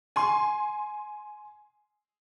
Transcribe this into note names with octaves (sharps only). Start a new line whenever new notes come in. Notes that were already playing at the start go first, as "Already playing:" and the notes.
G#5 C6